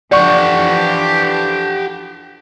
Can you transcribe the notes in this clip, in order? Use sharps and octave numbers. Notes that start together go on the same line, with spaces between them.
E3 F3 D4 G4 D5 F#5 C#6